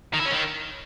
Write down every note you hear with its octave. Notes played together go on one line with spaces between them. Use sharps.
D#3
E4
C#4
D#3